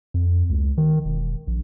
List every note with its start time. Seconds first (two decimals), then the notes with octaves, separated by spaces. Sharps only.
0.14 F2
0.50 C#2
0.78 D#3
1.05 E1
1.47 A#1